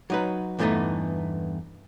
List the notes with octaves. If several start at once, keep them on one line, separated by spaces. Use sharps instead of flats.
F#3 D#4 B4
E2 G2 E3 A3 B3 D#4